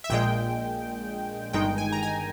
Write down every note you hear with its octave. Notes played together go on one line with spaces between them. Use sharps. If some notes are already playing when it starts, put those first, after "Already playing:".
E5
A#1 A#2 G#3 G5
G1 G2 D#3 G#3 D#4 G5
G#5
A#5
G#5